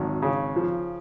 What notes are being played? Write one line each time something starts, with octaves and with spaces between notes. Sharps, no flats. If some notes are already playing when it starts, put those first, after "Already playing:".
Already playing: G#1 F#2
C#3
F3